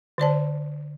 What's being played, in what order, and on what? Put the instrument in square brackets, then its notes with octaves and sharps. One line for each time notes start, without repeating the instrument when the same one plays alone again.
[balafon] D3 C5 D5 A5